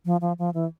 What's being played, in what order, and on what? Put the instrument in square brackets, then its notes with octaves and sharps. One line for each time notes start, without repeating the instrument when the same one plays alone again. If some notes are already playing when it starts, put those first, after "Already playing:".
[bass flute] F3
F3
F3
E3